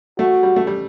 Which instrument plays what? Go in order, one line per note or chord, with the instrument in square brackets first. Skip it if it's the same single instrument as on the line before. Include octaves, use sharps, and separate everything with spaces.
[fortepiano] A3 [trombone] F#4
[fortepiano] G3
A3
G3